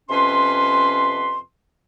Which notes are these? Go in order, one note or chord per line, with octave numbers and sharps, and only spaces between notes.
F2 C3 C#4 B4 C6